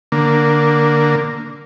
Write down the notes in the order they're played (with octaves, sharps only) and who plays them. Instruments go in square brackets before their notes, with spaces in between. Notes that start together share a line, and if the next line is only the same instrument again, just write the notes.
[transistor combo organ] D3 A#3